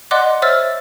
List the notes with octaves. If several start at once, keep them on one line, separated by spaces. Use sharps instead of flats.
D5 D#5 F#5 C6 D6 F#6
C5 C#5 E5 E6 F6 A6